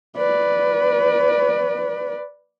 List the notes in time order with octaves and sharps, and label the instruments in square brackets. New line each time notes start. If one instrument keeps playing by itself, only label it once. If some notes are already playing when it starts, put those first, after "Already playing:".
[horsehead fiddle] B4 D5